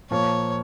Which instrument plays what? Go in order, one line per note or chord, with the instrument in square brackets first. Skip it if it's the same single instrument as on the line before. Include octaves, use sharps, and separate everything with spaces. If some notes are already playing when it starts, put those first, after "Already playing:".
[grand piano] A#2 F3 A#3 [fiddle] C#5